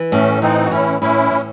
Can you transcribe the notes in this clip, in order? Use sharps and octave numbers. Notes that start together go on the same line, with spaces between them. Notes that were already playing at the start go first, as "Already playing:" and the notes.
Already playing: E3
A2 A3 C#4
E3 C4 D#4
F#4
A2 C#4 E4
A2 C#4 E4
A2